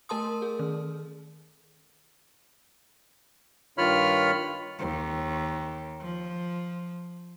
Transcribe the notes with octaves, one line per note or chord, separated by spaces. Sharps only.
A3 A#4 A5 C6 D#6
G#4
D#3
G2 D#3 F4 C#5 B5 F6
D#2
F3